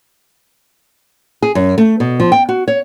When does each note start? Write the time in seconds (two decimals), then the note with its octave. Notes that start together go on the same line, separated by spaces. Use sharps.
1.42 G#4
1.55 F#2
1.78 A3
2.00 B2
2.20 F3
2.32 G5
2.49 F#4
2.68 C#5